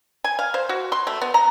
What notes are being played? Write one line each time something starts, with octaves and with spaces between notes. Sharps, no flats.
G#5
F5
C5
F#4
C6
A3
B3
A#5